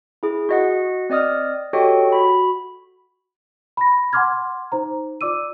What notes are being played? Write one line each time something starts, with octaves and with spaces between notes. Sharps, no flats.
E4 G#4
F#4 D#5 F#5
C4 D5 D#5 D#6 F6
F#4 G4 A4 C#5 D#5 G5
F#4 B5
B5 A#6
F#5 G#5 C6 D6 F6 G#6
D#4 C5 A#5
F4 D5 D6 E6 D#7